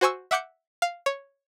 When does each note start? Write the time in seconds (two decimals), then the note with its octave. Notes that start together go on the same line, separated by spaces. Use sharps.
0.01 F#4 C5 G#5 C#6 E6
0.31 E5 F#5 D6 G6 C#7
0.82 F5
1.06 C#5